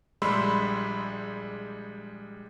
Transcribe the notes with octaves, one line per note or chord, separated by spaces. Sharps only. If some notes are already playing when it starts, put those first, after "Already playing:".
A#1 G3 G#3 B5 C6 E6